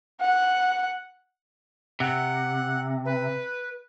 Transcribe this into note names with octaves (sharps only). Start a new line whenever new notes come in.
F#5
C3 F#5
B4